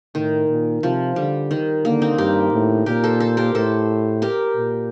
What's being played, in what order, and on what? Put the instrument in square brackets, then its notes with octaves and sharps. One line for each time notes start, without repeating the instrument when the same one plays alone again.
[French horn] A2 [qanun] D#3
[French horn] A#2
[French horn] C3 [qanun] F3
[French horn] D3 [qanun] G3
[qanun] D#3
[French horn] D3 [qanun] A#3
[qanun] C4 D#4
[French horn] G2 [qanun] G4 A#4
[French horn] A2
[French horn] A#2 [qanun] G4 A#4
[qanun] A4 C5
A4 C5
G4 A#4
[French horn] A2 [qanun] A4 C5
[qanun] G4 A#4
[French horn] A#2